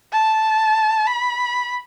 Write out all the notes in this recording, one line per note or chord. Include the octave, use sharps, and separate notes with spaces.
A5
B5